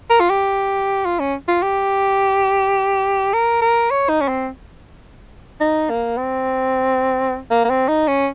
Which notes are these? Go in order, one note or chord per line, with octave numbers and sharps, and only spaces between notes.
A#4
F4
G4
F4
C#4
F4
G4
A#4
A#4
C#5
D#4
C#4
C4
D#4
A#3
C4
A#3
A#3
C4
D#4
C#4